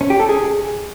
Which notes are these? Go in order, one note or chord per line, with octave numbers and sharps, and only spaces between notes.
C#4
G4
A4
G#4